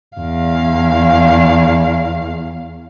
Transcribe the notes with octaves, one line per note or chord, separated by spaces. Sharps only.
E2 F5